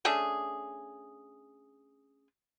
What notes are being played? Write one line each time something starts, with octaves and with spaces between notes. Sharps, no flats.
A3 C#4 D4 G#4